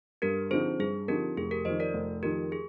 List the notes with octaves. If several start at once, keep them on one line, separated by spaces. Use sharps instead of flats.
G2 G4 A#4
D3 F3 C4 D#4 G#4 C5
G2 G#4
D3 F3 C4 D#4 G4 A#4
F1 G#4
G4 A#4
F2 D#3 C5 D#5
A#4 D5
F1
F2 D#3 G4 A#4
G#4